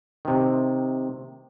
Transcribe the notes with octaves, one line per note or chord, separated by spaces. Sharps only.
C3 D#3